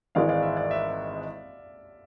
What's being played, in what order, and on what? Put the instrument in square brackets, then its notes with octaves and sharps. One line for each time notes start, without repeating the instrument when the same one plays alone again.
[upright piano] G#1 G#2 E3 G#3 [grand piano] D5 F5
[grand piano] D5 F5
E5
D5
E5